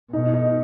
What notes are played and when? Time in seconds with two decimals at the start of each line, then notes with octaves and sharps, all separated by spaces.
0.13 B2 D#4
0.34 D#4